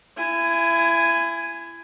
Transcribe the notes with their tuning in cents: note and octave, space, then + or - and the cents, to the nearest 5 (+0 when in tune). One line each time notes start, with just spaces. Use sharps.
E4 +30 G#5 +0